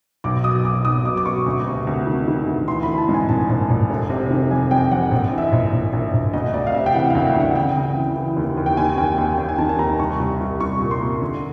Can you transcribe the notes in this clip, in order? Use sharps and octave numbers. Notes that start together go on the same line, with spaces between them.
B1 D6
B2 D#6
B1 D6
B1 D#6
B2 D6
D6
B2 C#6
D2
C3
D2
D#3
D#3
D2
E3 C6
E3 B5
A5
G#2
G#5
A#1 A5
A#1
A#1
F1
C3
D#3
F2 G#5
F2 G5
F2 F#5
A#1
E3
E5
D#5
A#1
A#1
A#1
A#1
D2 D#5
D#5
D2 D5
F5
C3 E5
G5
E3 F#5
D2 F5
E5
D2 F#5
C#3 G5
C#3
E3
E3
D#2
D#2
G5
D#2 G#5
D#2 G5
D#2 G5
D#2 G5
G#5
D#3 A5
A5
D#2 A#5
C2 C#6
C2
C2
C2 C#6
A#2
C6
A#2
D3